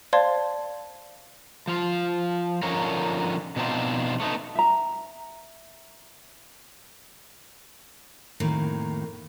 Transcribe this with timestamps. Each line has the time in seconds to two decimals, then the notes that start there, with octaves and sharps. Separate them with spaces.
0.13 C5 D5 F5 A5 C6 G#6
1.67 F3 F4
2.63 D3 F3 C#4 D#4 A#4 C#5
3.56 B2 F3 C4 D4 D#4 F4
4.20 A3 B3 D#4
4.55 E5 A#5
8.40 F2 A2 D#3 A#3